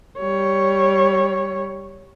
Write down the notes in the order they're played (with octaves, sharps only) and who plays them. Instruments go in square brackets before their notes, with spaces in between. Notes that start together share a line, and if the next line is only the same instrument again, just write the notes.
[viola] G3 C#5